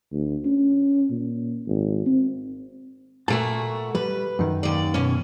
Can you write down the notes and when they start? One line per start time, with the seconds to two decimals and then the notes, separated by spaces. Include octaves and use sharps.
0.13 D2
0.45 C#4
1.11 A#2
1.66 G#1
2.06 C4
3.28 A#2 A3 F#4 A5
3.95 G3 B4
4.39 F#2 D#3
4.63 D#2 D5
4.94 B2 C#4